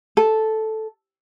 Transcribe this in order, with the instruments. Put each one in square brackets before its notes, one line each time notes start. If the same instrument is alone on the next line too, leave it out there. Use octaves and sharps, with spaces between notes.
[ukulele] A4